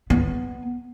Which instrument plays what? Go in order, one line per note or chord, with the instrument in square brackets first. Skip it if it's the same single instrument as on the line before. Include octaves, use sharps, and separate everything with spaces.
[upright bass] B3